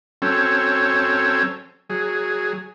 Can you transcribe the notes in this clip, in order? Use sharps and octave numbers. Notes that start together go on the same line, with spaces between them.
F#3 C4 C#4 A4 C#5
F#3 G#4